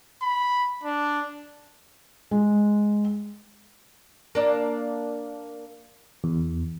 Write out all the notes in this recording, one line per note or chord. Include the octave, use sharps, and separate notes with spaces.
B5
D4
G#3
A#3 D4 D5
E2